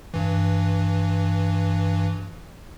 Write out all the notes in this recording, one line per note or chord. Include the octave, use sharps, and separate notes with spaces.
G2 E3